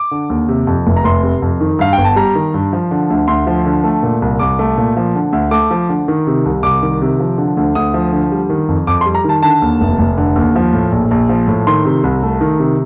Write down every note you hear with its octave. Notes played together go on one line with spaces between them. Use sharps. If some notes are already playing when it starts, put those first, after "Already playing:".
Already playing: D6
D3
D#2
C3
F2
F1
A#5
F1 C6
C3
F2
D#3
G2 F5
G5
G1
A5
G3 A#5
D#3
G2
F3
D3
D2
D2 C6
F3
D3
A3
A#2
C2
C2 D6
A3
A#2
F3
D3
D2
A3 D6
F3
D3
D#3
C3
C2
C2 D6
D#3
C3
F3
D3
D2
D2 D#6
F3
D3
G3
D#3
F2
F2 D6
C6
G3
A#5
D#3 A5
D3 A5
D#2
F1
F1
D3
D#2
F3
A2
A#1
A#1
F3
A2
D#3 C6
C3
C2
A3
D#3
C3